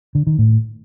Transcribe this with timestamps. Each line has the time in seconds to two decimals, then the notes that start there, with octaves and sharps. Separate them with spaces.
0.15 D3
0.27 D#3
0.38 A2